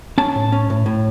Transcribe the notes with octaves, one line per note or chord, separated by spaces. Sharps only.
C#4 A5
A2
C#4
A2
A2